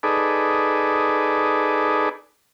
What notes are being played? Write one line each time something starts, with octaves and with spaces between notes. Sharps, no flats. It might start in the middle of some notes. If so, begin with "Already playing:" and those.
D#4 G#4 A4 B4 D5